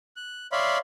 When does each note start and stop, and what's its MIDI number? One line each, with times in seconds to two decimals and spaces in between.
0.16 0.47 90
0.52 0.78 73
0.52 0.78 74
0.52 0.78 76
0.52 0.78 77
0.52 0.78 83
0.52 0.78 84